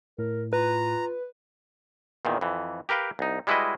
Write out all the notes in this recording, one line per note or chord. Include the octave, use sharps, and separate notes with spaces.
A2 A#4
F4 B4 A#5
E2 A#2 D#3
F2 E3
G4 A#4 B4 F5 G5
C2 D#4
G3 G#3 E4 F#4 B4 D#5